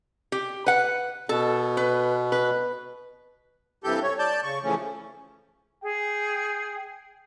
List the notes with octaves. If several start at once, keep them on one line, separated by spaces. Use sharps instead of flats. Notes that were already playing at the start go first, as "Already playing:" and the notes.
G4
B4 F#5
B2 A4
B4
B4
G2 C3 E3 G4 A4 G6
C#5
D5 A5 G6
C#3 C#6
C#3 E3 F3 A3 C#4
G#4 G5